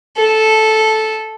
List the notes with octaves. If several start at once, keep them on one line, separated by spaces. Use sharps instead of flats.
A4